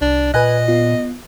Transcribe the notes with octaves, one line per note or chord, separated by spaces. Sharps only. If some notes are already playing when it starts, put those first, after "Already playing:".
C2 D4
A#2 B4 D#5 G#5 F#6
B3 F4